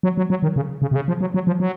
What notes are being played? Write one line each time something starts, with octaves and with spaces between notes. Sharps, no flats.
F#3
F#3
F#3
D#3
C#3
C#3
C3
C#3
F3
F#3
F#3
F3
F#3